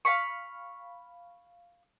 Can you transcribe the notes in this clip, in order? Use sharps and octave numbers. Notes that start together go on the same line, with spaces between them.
F5 F#5 B5 C#6